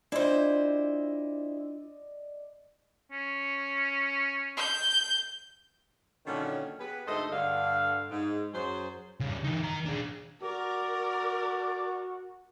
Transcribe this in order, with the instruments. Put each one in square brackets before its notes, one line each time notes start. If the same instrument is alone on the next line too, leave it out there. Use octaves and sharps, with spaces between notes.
[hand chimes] D4 F4 [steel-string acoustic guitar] E4 C5 [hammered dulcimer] D5 D#5
[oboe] C#4
[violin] G6
[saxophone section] A#2 D3 D#3 F#3 C#4
B3 G4 G#4 B4
D2 G#2 A3 A4 C5 D#5
G2 D3 F5
G#2
F#2 F#3 G#4 C5
[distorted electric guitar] C#3 G3
E3 D#4
D#3 A#5
D4 G#4
[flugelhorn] F#4 [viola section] A#4 [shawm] D5